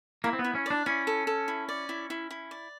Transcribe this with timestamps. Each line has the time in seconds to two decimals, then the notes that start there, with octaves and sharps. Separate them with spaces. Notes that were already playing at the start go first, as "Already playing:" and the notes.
0.24 A#3 E4
0.33 C4
0.39 B3
0.44 E4
0.55 C#4
0.66 D4 D5
0.86 C#4 E4
1.07 A4
1.27 A4
1.48 E4
1.69 D5
1.89 E4
2.10 E4
2.31 E4
2.51 D5